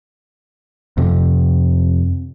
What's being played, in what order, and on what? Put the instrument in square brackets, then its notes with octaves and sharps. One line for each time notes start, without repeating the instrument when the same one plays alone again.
[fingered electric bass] F2 C3